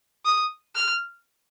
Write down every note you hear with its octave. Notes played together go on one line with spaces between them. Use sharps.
D#6
F6